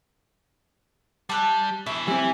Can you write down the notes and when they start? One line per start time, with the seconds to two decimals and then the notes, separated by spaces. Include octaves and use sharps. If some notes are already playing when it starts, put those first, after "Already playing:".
1.29 G3 A5 E6 F#6
1.86 B2 E3 E5
2.08 E3 G3 C4 G#5